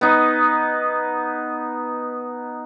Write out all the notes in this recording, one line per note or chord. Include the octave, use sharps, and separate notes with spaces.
B3 D#4